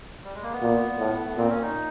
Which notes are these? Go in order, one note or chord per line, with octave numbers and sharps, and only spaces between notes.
G3
G#3
A#3
B3
A#2
A2
A#2 C4
C#4
D#4